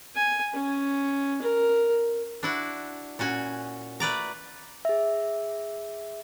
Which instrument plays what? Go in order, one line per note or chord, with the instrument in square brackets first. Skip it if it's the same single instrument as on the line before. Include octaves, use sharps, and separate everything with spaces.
[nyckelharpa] G#5
C#4
A#4
[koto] D4 E4 F#4
A#2 C#4 F#4 G#5
A3 B4 D5 A#5
[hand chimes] G#4 E5